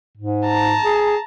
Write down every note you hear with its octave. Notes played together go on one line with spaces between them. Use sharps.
G#2
A5 A#5
G#4